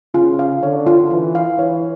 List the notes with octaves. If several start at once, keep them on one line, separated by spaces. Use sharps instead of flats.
C#3 F4
F5
D3 C#5
F4
E3 F4
F5
E3 C#5